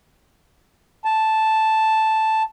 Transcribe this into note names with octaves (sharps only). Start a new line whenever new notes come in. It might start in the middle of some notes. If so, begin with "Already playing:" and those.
A5